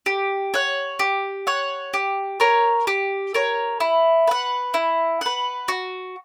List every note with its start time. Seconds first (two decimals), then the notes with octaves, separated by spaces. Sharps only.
0.06 G4
0.54 C#5 F#5
0.99 G4
1.47 C#5 F#5
1.94 G4
2.40 A#4 C#5
2.87 G4
3.34 A#4 C#5
3.80 E4
4.27 B4 F#5
4.74 E4
5.21 B4 F#5
5.68 F#4